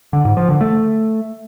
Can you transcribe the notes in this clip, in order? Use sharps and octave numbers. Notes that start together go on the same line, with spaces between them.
D3
G#2
F3
D3
A3